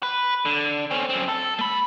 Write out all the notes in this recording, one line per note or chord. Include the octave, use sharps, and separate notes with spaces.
B4
D3
C4 C#4
F#2 C4
A4
A3 B5